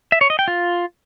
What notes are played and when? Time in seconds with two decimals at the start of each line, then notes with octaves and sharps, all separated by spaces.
0.12 E5
0.21 C#5
0.30 D#5
0.39 G5
0.48 F4